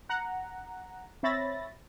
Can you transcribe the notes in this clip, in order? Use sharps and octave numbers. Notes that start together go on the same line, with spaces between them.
F#5 A#5
C4 C#5 E5 B5 A6 A#6